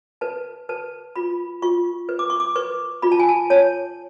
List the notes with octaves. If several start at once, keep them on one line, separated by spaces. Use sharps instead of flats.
B4 A5
B4 A5
F4 B5
F4 C#6
B4
D6
C#6
D6
B4 C#6
F4 B5
A5
G#5
A5
C#5 A5